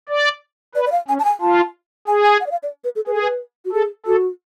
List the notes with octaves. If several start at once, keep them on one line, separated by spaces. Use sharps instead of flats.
D5
B4 D5
D5
F5
C#4 G#5
A5
G#5
F4 A5
G#4 G#5
G#5
F#5
D5
F5
D5
B4
A4
G#4 B4
A4
B4
F#4
G#4 A4
F#4 A4